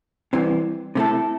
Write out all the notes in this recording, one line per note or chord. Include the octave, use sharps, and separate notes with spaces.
C2 C3 E3
C3 A3 E4 A4